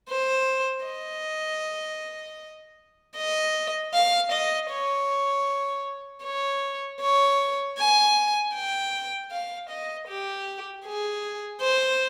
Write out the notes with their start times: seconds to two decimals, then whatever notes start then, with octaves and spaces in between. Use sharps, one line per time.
0.09 C5
0.86 D#5
3.16 D#5
3.93 F5
4.32 D#5
4.71 C#5
6.24 C#5
7.01 C#5
7.78 G#5
8.55 G5
9.31 F5
9.70 D#5
10.08 G4
10.85 G#4
11.61 C5